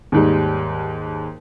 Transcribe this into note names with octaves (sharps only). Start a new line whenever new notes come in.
D#2 G#2 G3